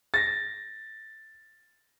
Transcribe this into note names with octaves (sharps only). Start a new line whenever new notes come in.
A6 A#6